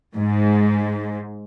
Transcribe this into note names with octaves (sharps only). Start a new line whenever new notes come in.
G#2